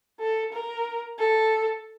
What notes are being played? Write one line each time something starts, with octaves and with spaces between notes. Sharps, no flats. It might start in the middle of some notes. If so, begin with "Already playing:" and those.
A4
A#4
A4